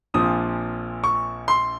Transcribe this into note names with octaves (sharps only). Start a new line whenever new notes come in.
A#1 A#2 F3 C4 D#6
C#6
C6